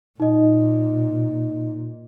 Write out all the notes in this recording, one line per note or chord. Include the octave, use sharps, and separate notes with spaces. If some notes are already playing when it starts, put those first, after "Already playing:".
A#2 D#4 D#5